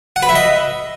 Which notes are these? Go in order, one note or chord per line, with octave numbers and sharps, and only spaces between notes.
F#5
B4
E5
D#5